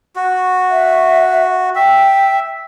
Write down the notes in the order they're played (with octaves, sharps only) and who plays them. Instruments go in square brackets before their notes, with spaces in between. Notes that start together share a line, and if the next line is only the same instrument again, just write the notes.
[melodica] F#4
[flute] E5
[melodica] E5 [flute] G5